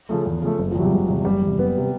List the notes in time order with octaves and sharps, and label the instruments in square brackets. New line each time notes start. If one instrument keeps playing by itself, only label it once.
[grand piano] C#3 F3 A3
E2
C#3 F3 A3
F#1
[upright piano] F3
[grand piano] E2 [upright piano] F#3
[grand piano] C3
[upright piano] G3
[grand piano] F#1 [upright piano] G#3
[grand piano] E2 C3
[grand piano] F#1 [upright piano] G3
[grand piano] E2
C3
[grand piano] F#1 [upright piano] B3
[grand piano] C3